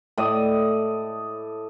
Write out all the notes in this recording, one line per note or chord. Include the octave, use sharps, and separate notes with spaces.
A2 D5 D#5